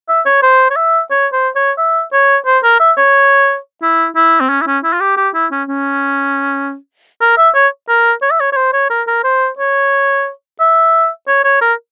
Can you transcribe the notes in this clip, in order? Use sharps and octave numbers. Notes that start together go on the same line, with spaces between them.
E5
C#5
C5
C#5
E5
C#5
C5
C#5
E5
C#5
C5
A#4
E5
C#5
E4
E4
C4
C#4
E4
C#4
E4
F4
G4
G4
E4
C#4
C#4
A#4
E5
C#5
A#4
C#5
E5
C#5
C#5
C5
C#5
A#4
A#4
C5
C#5
E5
C#5
C#5
A#4